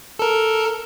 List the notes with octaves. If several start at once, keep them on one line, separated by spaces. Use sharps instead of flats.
A4 A#4